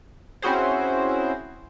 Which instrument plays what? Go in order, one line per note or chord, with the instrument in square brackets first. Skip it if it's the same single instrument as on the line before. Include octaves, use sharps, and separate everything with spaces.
[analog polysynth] C4 C#4 E4 F#4 G#4 C5